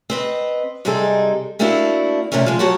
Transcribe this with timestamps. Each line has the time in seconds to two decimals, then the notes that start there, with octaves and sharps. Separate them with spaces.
0.10 C4 B4 D#5
0.85 C3 G3 G#3 D#4 G#4 A4
1.59 A3 A#3 C4 D4 E4 F#4
2.32 C3 G3 A3 A#3 C#4
2.46 F3 G#3
2.59 F#3 A#3 F#4 G4 C#5 A5